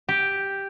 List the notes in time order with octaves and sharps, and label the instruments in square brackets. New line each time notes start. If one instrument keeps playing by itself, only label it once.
[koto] G4